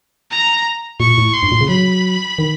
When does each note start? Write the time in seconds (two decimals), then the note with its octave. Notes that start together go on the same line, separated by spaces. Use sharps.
0.31 A#5
1.00 A#2 C#6
1.18 A2
1.34 C6
1.43 G2
1.52 A#2
1.61 C#3
1.69 F#3 B5
2.39 D#3